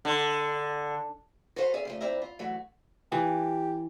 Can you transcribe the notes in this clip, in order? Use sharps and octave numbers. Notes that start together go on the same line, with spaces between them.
D3
F#4 A4 B4 C5 F5
G#4 D5 E5 F5
C#3 F3 A3
F2 C4 D4 E4 E5 A#5
F4
E3 F#3 A3 F#4
E3 G4